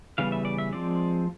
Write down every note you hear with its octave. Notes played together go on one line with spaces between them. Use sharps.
C#3 E3 G3 B3 F5
E5
D5
E5
F3 G#3 C4 D5